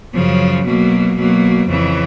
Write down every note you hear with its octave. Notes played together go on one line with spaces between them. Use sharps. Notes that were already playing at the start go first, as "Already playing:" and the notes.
F#2 C#3 F3
B2 F#3 A#3
B2 F#3 A#3
F2 C#3 E3